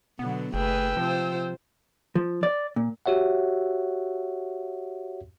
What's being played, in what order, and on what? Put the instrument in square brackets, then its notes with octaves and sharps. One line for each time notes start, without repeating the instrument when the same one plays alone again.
[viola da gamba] B2 D3 F#3 [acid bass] B3
[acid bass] F#1 [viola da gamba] A3 G#4 B4 [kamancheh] G5 E6
[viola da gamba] C3 F4 C5 [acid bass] F3
[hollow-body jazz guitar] F3
D5
A#2
[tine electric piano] F#4 G4 C#5 E5 F#5